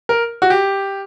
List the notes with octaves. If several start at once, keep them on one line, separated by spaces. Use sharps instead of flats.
A#4
F#4
G4